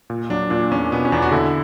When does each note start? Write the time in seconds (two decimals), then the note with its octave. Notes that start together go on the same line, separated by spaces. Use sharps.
0.10 A#2
0.30 F#3 D4
0.50 A#2 D4
0.71 E2 C#4
0.92 B2 B3
1.05 C#4
1.12 E2 D4
1.22 F#4
1.32 D3 E4